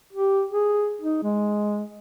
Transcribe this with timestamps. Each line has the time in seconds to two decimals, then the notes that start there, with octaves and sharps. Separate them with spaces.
0.13 G4
0.51 G#4
1.01 D#4
1.23 G#3